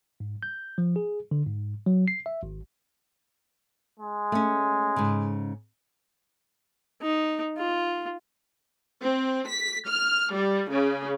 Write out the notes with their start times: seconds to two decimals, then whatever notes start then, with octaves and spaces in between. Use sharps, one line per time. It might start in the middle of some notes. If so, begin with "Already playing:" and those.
0.20 G#2
0.43 G6
0.78 F3
0.96 G#4
1.31 D3
1.46 G#2
1.86 F#3
2.08 C7
2.26 E5
2.43 G#1
4.00 G#3
4.32 A3 C#4
4.96 G#2 C#3
7.02 D#4
7.57 F4
9.02 C4
9.48 B6
9.88 F6
10.34 G3
10.71 C#3